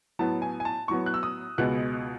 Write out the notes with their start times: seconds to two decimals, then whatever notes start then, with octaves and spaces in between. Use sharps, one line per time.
0.19 A2 F#3 B3 A5
0.42 G#5
0.60 G#5
0.65 A5
0.88 A2 F#3 B3 C#6
1.06 F#6
1.14 E6
1.23 D#6
1.58 C#2 B2 G#3 B3 F#6